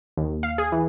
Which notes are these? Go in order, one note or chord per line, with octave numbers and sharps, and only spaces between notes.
D#2
F5
G#4
E3